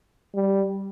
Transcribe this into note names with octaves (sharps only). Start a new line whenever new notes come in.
G3